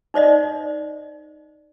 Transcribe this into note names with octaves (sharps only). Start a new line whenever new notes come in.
D#4 C5 D5 D#5